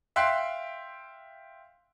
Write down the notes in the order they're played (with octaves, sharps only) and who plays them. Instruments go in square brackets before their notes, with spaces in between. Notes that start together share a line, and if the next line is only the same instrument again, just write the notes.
[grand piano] E5 F5 G5 C6 F#6 C7